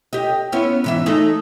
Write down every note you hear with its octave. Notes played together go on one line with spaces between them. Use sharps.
G4 D#5
B3 C#4 E4
G#2 E3 E5
A3 D#4 G#4